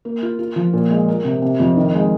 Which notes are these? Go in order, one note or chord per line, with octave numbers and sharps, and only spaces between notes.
A#3
F4
F4
F3
A#2
G#3
A#4
C3
C3
F2
D#3
G#3